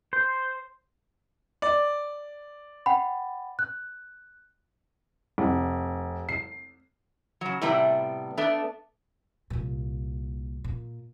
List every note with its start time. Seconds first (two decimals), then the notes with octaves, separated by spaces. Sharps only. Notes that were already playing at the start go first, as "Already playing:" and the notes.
0.13 C5
1.62 D5
2.86 F#5 G5 B5
3.59 F#6
5.38 F1
6.29 C7
7.41 C#3 F#3
7.62 A2 C3 G3 B3
8.37 A3 B3 D4
9.50 C2 A#2
10.64 A#2